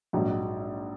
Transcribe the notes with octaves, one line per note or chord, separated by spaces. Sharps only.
A#1 G#2 F#3